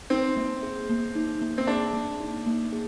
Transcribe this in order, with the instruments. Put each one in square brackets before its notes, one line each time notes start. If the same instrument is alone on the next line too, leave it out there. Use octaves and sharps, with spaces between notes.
[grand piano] C4 [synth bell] D#4
[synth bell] A#3
G#4
A#3
D#4
A#3
[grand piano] C4
[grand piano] D4 [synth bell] G#4
[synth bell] A#3
D#4
A#3
G#4